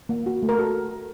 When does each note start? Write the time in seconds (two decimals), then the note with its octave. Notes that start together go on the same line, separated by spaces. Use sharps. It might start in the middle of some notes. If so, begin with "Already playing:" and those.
0.09 A#3
0.26 F#4
0.43 A3
0.49 A#4
0.59 F#4 A4